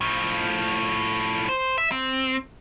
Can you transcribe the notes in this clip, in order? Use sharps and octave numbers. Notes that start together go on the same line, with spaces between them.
A2 F3
C5
E5
C4